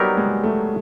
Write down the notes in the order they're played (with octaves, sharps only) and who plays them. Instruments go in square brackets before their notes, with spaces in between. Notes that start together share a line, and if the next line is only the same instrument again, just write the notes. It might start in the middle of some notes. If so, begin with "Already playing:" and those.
Already playing: [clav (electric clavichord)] F#3 B3 D#4 G4 A#4 [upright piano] G3
[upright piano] G#3
A3